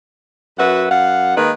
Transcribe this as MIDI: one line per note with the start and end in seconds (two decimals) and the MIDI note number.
0.58 0.86 42
0.58 0.86 66
0.58 0.86 71
0.58 0.86 76
0.58 0.86 78
0.90 1.34 42
0.90 1.34 77
0.90 1.34 78
1.36 1.51 51
1.36 1.51 56
1.36 1.51 58
1.36 1.51 63
1.36 1.51 71